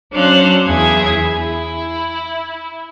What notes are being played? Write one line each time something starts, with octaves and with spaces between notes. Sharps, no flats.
F#3 C#4 D4 C5 F5 F#6
E2 E4 G#4 G#6
E4